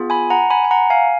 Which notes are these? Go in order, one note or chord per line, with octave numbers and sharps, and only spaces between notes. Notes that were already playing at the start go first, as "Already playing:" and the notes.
Already playing: B3 F4 G#4
G#5 B5
F#5 A#5
G#5 B5
G#5
F#5 A#5
F5 G#5